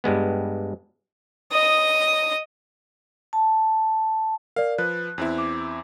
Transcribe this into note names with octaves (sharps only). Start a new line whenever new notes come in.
G2 G3 G#3 B3
D#5 D#6
A5
A#4 D5 F5
F3 B4 F#6
E2 C4 E4
D6